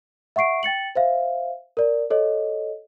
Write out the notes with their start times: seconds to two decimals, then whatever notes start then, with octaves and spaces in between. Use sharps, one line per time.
0.36 E5 F#5 C#6 C7 D7
0.63 G5 A6 C#7 F#7
0.96 C5 E5 F5
1.77 A#4 D5
2.10 A4 C#5 D#5